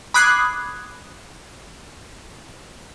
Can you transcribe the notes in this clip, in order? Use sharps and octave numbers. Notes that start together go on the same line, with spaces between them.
B5 D6 D#6 F#6 G#6 C7